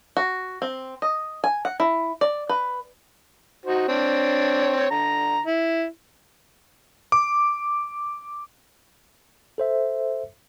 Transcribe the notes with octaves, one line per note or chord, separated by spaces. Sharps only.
F#4
C4
D#5
G#5
F#5
E4
D5
B4
D#4 F#4 C5
C4 D4 C#5
D3 A#5
E4
D6
A4 C5 E5